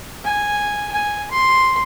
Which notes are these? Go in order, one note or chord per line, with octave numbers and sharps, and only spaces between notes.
G#5
G#5
C6